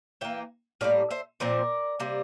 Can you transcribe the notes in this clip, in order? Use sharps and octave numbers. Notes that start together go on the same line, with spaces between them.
E3 A#3 E5 G5
A2 G3 A#3 D5 F5
C5 E5
A#2 F3 C4 A#4 D5
C3 G3 A#3